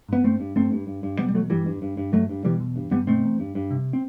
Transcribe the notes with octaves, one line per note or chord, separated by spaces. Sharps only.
G2 B3
G2 A3 C4
G2
G2 A3 C4
G2
G2
G2
B2 G3 B3
G3
E2 F#3 A3
G2 E3 G3
G2
G2
G2
G2 F#3 A3
G2
B2 E3 G3
E2
G2
G2 G3 B3
B2 A3 C4
E2
G2
G2
C3
C4